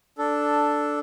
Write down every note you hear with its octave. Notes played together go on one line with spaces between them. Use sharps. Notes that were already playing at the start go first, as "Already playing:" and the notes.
D4 A4